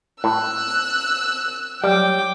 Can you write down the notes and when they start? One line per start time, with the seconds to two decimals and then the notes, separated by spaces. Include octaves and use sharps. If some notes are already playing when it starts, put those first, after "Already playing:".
0.24 A2 E6 F#6
1.84 F#3 G3 G5 D6